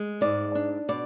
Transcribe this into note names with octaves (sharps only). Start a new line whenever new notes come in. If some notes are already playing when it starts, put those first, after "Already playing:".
Already playing: G#3
G#2 D5
D4
B2 D5